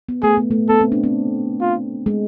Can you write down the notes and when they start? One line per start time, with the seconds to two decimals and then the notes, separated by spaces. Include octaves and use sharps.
0.09 B3
0.23 A3 G#4
0.37 B3
0.51 A3
0.69 B3 A4
0.81 C4
0.92 D4
1.04 C4
1.61 F4
2.06 G#3